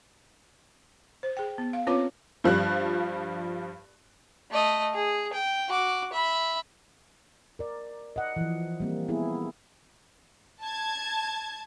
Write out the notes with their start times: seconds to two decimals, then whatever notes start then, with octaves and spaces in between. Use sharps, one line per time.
1.23 C5
1.37 G#4 G5
1.58 B3
1.73 F5
1.87 C4 C#4 F4 B4 C#5 D6
2.44 G2 F3 G3 F#6
4.51 A3 D#5
4.94 G#4
5.33 G5
5.69 F#4 D6
6.13 E5 B5
7.59 A#4 D5
8.16 D#5 F#5
8.36 E3 F3
8.80 G3 A#3 C4
9.09 B3 E4 G#4
10.62 A5 G#6